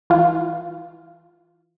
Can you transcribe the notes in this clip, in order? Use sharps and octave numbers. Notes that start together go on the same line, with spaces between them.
E3 F4